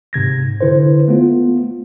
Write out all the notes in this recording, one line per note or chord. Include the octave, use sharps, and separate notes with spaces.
G#2 C3 G#6 A#6
D3 E4 B4 C5
A3 B3 F4